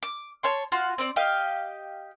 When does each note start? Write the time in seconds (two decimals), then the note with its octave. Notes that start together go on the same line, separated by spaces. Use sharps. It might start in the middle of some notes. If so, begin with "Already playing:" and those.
0.03 D6
0.43 C#5 A5 C6
0.72 F4 F#4
0.98 C4 D5
1.16 G4 D#5 F5